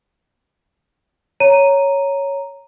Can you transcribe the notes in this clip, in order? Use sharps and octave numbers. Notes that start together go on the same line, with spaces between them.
C#5 A#5 D#7